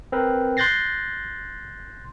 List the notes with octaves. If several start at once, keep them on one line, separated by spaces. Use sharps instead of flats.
C4 A#4 B4
C6 F#6 G6 A6 A#6 C7